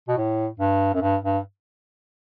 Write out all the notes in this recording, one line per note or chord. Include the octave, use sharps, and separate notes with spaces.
B2
A2
G2
F#2
G2
G2